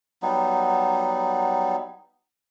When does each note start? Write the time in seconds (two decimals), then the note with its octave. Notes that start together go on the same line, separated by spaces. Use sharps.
0.22 F#3 G3 B3 D#4